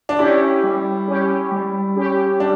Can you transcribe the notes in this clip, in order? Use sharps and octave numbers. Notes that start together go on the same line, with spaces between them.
D4
C#4 E4 G4
G3
C#4 G4
G3
C#4 G4
G3 D4